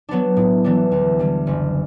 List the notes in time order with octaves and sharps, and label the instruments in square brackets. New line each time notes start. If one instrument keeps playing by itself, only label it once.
[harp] F#3 B3 D4
A2
E3 G3 B3 D4
D2
D3 G3
F#1